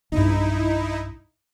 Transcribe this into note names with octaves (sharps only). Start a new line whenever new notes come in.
B1 G2 D#4 E4